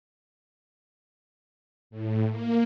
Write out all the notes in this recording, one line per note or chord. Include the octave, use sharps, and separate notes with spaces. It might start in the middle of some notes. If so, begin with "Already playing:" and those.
A2
A#3